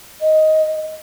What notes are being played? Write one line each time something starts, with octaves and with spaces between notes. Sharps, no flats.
D#5